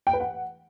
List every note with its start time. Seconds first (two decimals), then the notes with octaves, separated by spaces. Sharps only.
0.07 G5
0.13 B4
0.20 F#5